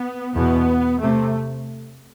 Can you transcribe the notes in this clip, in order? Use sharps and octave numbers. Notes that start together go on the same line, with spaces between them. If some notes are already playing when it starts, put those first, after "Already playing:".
Already playing: B3
E2 B2 B3
C3 A3